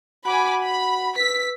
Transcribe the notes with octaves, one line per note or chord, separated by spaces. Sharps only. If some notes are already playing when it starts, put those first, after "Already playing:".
F#4 F#5 G#5 B5 D6
B5
B4 E6 B6